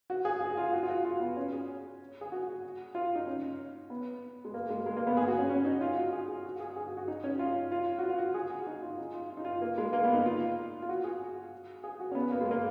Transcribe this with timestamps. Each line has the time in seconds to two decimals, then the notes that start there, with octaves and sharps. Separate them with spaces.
0.10 F#4
0.25 G#4
0.41 G#4
0.57 F4
0.73 F#4
0.83 F4
0.90 F#4
1.05 F4
1.20 B3
1.36 C#4
1.53 G#4
2.21 G#4
2.32 F#4
2.95 F4
3.16 D#4
3.26 C#4
3.90 B3
4.45 G#3
4.54 A#3
4.70 G#3
4.86 G#3
4.97 A#3
5.07 B3
5.17 G#4
5.28 F#4
5.39 C#4
5.49 C#4
5.65 D#4
5.81 F4
5.97 F#4
6.13 G#4
6.29 G#4
6.45 F#4
6.60 G#4
6.76 G#4
6.87 F#4
6.97 F#4
7.08 D#4
7.24 C#4
7.39 F4
7.71 F4
7.99 F#4
8.03 F4
8.18 F#4
8.34 G#4
8.51 F#4
8.67 D#4
8.82 F4
8.98 D#4
9.14 F4
9.30 F4
9.37 D#4
9.45 F4
9.62 A#3
9.78 G#3
9.93 A#3
10.04 B3
10.14 D#4
10.26 F4
10.82 F4
10.89 F#4
11.04 G#4
11.84 G#4
12.00 F#4
12.12 C#4
12.15 B3
12.32 A#3
12.41 G#3
12.51 A#3